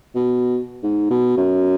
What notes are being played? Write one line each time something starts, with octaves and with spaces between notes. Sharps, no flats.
B2
G#2
B2
F#2